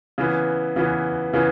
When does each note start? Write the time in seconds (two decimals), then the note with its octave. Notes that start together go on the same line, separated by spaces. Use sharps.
0.18 C#3 E3 B3
0.76 C#3 E3 B3
1.33 C#3 E3 B3